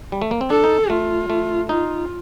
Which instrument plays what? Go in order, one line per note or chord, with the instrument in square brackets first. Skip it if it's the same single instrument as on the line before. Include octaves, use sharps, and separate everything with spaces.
[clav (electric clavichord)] G3
A3
A#3
C4
[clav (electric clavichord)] D4 [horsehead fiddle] A4
[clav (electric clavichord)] D#4
[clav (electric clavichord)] A3 [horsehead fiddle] F4
[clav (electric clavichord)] A3
[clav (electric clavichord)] D#4 [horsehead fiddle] F4